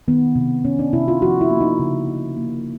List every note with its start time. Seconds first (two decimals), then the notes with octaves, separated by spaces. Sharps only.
0.08 D#3 B3
0.36 C3
0.64 C3 C#4
0.79 D4
0.93 C3 E4
1.08 F4
1.22 F3 F#4
1.41 E4
1.51 A#3
1.61 D#4
1.80 C#3
2.08 C#3
2.37 A#3